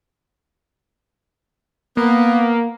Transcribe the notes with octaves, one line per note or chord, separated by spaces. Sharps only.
A#3 B3